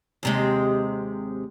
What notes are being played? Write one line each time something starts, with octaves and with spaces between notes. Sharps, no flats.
D#2 C3 G#3